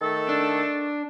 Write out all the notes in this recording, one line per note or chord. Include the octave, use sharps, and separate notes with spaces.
D#3 A3 A4
D4